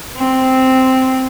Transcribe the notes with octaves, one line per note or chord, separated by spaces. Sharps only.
C4